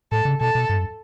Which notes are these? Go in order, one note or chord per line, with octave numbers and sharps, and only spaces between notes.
A2 A4
C#3
B2 A4
B2
G2
F#2